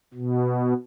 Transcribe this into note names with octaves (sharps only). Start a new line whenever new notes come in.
B2